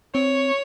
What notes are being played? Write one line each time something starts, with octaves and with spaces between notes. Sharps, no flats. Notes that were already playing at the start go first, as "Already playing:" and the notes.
C4 C#5